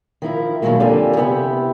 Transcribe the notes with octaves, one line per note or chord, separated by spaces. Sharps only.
D#3 F3 E4 A#4
B2 D#3 E3 F#3 G#3 A#3
F2 D3 A#3 G4 D5 G#5
C3 B3 E4 G4 A4 B4